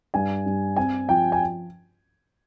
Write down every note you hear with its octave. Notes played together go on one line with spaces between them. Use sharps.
G2 G#5
G2
C4 G#5
F3 G5
G#5